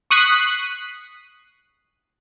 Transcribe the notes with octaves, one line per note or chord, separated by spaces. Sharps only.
C#6 D#6 F#6 B6 C7